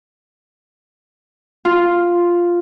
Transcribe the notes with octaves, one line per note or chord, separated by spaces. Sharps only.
F4